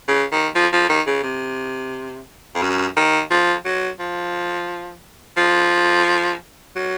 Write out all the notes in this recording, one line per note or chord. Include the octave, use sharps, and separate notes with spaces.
C#3
D#3
F3
F3
D#3
C#3
C3
F2
F#2
D#3
F3
F#3
F3
F3
F#3